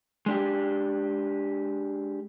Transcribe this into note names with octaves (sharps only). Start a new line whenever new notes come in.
G#3 D4 G4